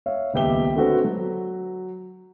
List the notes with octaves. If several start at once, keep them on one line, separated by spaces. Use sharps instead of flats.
C#5 E5 F5
D#1 C#2 B3 G4 E5 G7
D3 A3 C4 F#4 A4 B4
F#3